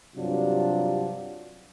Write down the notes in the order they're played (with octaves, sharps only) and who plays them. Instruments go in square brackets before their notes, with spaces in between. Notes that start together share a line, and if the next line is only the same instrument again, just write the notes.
[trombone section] G2 C3 F#3 D4 F4